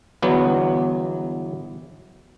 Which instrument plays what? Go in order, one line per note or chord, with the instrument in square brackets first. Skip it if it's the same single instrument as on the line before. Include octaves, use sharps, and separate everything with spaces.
[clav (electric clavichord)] G1 E2 F#3 B3